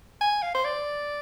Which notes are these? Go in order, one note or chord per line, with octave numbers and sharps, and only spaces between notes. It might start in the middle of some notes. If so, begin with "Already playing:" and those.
G#5
F5
C5
D5